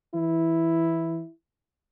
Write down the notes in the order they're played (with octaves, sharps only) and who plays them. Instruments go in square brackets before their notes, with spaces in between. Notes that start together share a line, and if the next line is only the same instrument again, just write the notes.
[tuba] E3 [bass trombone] E4